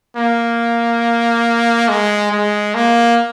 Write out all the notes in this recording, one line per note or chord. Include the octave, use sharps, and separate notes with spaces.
A#3
G#3
G#3
A#3